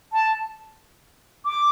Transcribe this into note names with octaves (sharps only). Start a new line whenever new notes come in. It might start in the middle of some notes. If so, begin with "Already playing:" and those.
A5
D6